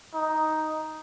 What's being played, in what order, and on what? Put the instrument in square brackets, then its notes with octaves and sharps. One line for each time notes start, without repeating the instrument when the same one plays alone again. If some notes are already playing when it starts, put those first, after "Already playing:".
[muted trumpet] D#4